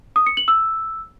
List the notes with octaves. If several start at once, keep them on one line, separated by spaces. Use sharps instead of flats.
D#6
C#7
F#7
E6